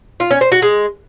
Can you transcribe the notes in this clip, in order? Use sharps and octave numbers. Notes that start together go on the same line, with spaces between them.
F4
C#4
C5
F#4
G#3